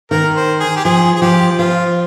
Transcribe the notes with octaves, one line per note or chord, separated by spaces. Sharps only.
D#3 A#4
C5
G#4
G4
F3 G#4
G#4
F3 G4
F3 F4